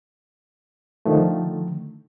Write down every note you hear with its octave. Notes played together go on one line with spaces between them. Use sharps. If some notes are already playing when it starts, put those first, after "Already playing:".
D3 D#3 F3 A3